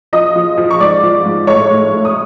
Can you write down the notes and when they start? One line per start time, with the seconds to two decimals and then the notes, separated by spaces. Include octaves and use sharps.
0.13 F3 D#5 D#6
0.35 F3
0.58 F3
0.71 C#6
0.80 G#2 D5 D6
1.03 F3
1.25 G#2
1.47 A2 C#5 C#6
1.70 A2
1.93 A2
2.05 D#6